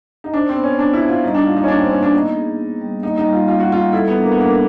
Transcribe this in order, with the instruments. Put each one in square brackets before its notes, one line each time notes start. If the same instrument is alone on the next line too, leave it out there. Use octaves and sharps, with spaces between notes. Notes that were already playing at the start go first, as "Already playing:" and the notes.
[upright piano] D#4
[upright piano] D4 [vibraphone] C5
[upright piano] C4
[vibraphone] B3
[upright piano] C#4
[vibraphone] B3 [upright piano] D4
[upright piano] E4
[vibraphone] C5
[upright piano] F4
[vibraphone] G3 [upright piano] D#4
[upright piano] D4
[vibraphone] A#3 [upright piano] F4
[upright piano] D#4
C#4
[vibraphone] A#3 [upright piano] D4
[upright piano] C4
[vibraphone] A#3 [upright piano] C#4
[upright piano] D4
[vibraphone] B3 [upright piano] D#4
[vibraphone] G#4
G#4
G3
[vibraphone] A#3 [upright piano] D#4
[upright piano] D#4
[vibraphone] G3
[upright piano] F4
[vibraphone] C#4 [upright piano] F4
[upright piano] F#4
[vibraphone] G3 [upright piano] F4
[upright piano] E4 [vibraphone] A4
[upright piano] B3
[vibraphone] D4
[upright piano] A#3
B3
[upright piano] A#3 [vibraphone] D4